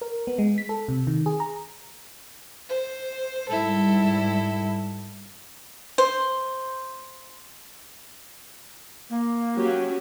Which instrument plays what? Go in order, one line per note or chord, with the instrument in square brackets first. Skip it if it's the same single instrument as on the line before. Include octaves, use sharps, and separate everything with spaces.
[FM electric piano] A#4
B3
G#3
B6
A4
C3
D#3
G#4
A#5
[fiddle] C5
[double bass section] G#2 G3 [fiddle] E4 A4
[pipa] C5
[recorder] A#3
[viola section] F#3 C#4 G4